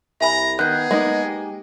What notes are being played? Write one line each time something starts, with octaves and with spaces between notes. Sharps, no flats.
C2 E5 G#5 A#5 B5
D#3 B3 G#4 F#6 G6
G#3 A#3 D#4
G4